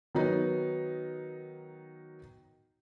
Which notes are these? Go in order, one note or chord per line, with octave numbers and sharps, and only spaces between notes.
D#3 F#3 B3 D#4